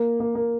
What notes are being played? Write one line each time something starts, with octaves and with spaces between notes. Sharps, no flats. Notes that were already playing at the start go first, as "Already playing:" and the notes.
Already playing: A#3
A#3
A#3